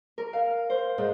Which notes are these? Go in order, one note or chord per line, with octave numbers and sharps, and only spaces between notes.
A#4
F5
C5
G#2